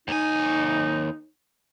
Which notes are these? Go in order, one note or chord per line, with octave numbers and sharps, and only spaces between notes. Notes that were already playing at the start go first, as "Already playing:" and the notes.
D#2 D#4 G#5